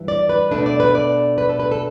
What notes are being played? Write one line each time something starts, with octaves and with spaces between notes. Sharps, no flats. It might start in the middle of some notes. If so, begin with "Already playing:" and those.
Already playing: G2 E3
D5
B4
B2 A3 D4 B4
D5
B4
D5
B4
A4
B4
A4